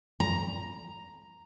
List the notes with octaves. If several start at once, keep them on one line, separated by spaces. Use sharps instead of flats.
A#5